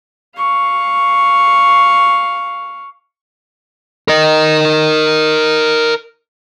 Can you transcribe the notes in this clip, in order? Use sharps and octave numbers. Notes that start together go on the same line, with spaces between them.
F5 C#6
A#4 D#5